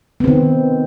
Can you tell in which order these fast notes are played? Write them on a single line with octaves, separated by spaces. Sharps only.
B3 C4 D#3